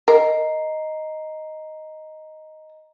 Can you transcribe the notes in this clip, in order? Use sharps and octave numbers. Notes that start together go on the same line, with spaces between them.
A#4 D#5 A#5 C7